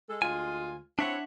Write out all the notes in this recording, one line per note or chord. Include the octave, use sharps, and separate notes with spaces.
G#3 A4
D2 G#3 F4 G#5
C4 D4 E4 C#5 E5 F#5